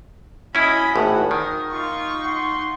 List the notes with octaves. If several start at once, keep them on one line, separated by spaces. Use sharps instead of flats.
C#4 E4 F#4 D#5 G#5 B5
G#1 A2 F#5
D#3 A#4
D#4 F4 C#6
F4 F#5 C6